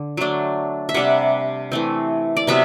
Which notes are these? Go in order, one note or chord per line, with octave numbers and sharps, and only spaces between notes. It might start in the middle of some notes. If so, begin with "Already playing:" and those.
Already playing: D3
F#3 A3 D4
E5
C3 G3 D4 F#5
E3 A3 C4
D5
C3 F#3 B3 E5